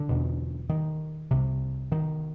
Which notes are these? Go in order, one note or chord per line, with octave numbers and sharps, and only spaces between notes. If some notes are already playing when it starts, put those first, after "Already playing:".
Already playing: D3
E2 B2
D#3
C2 C3
D#3